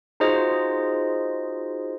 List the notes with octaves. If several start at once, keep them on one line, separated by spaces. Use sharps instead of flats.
D#4 F4 F#4 G#4 C5 D#5